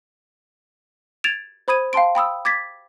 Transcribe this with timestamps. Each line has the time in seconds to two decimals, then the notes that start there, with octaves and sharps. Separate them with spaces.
1.24 G#6 A6 D7 E7 F7
1.68 C5 B5 D#6 G#6 D#7
1.93 F5 G5 A5 C6 D7
2.15 G5 B5 D#6 E6
2.45 D6 G#6 A6 B6